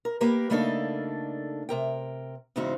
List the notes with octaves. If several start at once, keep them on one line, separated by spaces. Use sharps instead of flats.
A#4
A#3 G4 A#4 B4
C#3 A3 A#3 D4 D#4 A4
C3 A#4 G5
E2 G#2 C#3 C4 D#4 F#4